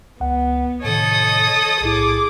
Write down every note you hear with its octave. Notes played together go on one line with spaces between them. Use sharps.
C#2 B3 F#5
A2 C3 D#3 A4 C#5 D#5 D#6
B1 A2 E4 G#4 D6